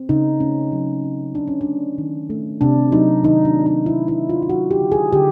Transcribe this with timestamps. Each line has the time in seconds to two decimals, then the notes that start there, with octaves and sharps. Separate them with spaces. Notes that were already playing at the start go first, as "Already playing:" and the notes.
Already playing: C4
0.09 C#3 D#4
0.40 A3 C#4
0.72 F#3
1.04 C4
1.35 C#3 D4
1.48 C#4
1.61 D4
1.67 A3
1.98 D#3
2.30 A3
2.61 C3 D4
2.92 F#3 D#4
3.24 D#3 D#4
3.45 D4
3.56 A3
3.66 D#4
3.86 C3 E4
4.08 E4
4.18 F#3
4.29 F4
4.42 F4
4.49 F#3 F#4
4.71 G4
4.81 D3
4.92 G#4
5.13 D3 G4